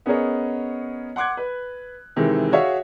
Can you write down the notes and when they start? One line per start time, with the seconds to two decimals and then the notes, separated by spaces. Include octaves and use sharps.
0.06 B3 C#4 G#4 A#4 C#5 D#5
1.16 F#5 C6 D6 F#6 G#6
1.37 B4
2.16 C3 D#3 E3 G#3
2.52 F#4 G#4 C#5 E5 F5